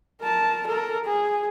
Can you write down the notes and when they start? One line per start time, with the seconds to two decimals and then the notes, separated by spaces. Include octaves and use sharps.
0.21 A#4 A5
0.67 A4 A#4
1.04 G#4